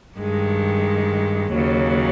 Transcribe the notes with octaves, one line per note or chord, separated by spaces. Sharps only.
G2 D#3 G#3
D#2 C#3 F#3